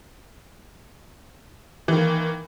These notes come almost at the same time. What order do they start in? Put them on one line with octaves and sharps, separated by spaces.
E3 D#3 A#3